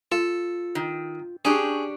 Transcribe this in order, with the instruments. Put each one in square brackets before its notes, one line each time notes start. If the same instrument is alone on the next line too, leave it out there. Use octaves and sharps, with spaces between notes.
[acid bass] F4 [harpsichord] A4
[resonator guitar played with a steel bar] D#3
[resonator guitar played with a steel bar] C#4 D4 G4 [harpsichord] G#4